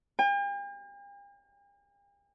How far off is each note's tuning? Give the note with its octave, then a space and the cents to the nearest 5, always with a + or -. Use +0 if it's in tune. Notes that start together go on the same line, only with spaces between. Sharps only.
G5 +45